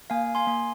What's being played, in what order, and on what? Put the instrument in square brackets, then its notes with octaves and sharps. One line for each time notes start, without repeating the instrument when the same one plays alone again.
[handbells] A#3 F5 G#5
G#5 C6
A#3